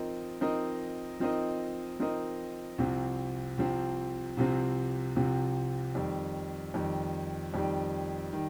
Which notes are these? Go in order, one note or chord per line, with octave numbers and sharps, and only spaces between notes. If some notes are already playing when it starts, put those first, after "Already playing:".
Already playing: F3 C4 D#4 A#4 D#5
F3 C4 D#4 A#4 D#5
F3 C4 D#4 A#4 D#5
F3 C4 D#4 A#4 D#5
C2 C3 F3 C4
C2 C3 F3 C4
C2 C3 F3 C4
C2 C3 F3 C4
F2 D#3 G3
F2 D#3 G3
F2 D#3 G3
D#3 G3